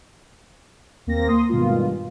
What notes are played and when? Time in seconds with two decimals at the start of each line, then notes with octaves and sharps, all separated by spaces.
1.07 D#2 A#3 C4 A#6
1.28 C6 D#6
1.49 G2 B2 D#3 G#3 F4